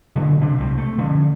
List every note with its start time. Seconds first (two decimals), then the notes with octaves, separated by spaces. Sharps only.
0.16 C#3 F#3 A3 C4
0.40 C3 C4 D4
0.58 C2 F#3 C4
0.78 A3
0.98 D3 F3 C#4